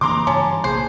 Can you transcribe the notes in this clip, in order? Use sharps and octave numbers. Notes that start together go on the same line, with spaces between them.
C#3 E3 A#3 A#5 C6 D6
G2 C#3 E3 C#4 A5
A#1 C3 A#3 G#4 C5